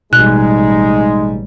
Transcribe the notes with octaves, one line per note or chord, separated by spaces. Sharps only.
A1 B2 G3 G#3 D#4 F#6